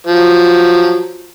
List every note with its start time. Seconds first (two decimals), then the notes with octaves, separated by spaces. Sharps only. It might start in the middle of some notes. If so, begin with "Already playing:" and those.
0.07 F3 F#3